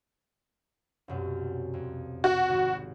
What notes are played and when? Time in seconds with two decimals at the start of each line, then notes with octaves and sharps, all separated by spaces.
1.08 C2 F#2 B2
1.74 F2
2.24 F#4
2.49 G#1 E7